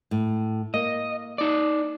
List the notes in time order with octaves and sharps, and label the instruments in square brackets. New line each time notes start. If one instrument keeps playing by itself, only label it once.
[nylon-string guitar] A2
[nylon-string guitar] A#3 [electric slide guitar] D#5
[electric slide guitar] D#4 D5